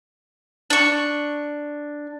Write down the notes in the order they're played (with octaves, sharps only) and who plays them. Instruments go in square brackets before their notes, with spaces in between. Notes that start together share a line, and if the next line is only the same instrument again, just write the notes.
[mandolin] D4 C#6